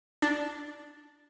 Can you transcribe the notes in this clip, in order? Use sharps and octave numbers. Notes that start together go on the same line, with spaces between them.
D4